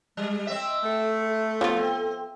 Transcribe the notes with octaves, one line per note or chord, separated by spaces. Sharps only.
G3 G#3
C4 D#5 E5
A3 A4
A4
F3 B3 F4
C4